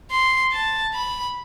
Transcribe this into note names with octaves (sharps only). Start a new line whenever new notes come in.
C6
A5
B5